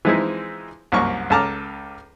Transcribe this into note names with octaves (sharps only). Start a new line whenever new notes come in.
E3 F3 G#3 C4 D#4 E4
C2 F#2 A#3 C#6
C#2 A4 A5 A#5 D6 F6